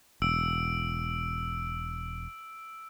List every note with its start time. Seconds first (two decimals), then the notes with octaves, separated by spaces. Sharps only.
0.22 E1 E6 D7